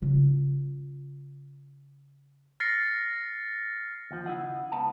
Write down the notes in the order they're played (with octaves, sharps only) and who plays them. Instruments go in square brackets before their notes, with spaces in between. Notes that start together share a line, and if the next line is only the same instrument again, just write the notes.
[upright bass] C#3 F4
[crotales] F6 A6 A#6 C7 C#7
[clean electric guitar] D#2 F3
C#3 E4 F4 D#5 F#5
C#2 B3 A5